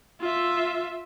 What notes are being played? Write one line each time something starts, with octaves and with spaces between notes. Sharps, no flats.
F4 E5